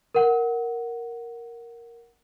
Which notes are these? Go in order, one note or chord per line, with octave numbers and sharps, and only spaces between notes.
A#4 F#5